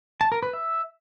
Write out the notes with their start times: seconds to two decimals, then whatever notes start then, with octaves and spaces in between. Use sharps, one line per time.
0.21 A5
0.32 A#4
0.43 B4
0.53 E5